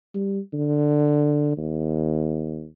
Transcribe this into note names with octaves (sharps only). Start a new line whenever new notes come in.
G3
D3
D#2